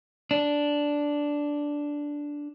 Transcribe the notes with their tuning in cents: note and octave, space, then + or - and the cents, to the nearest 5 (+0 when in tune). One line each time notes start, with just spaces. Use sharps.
D4 -5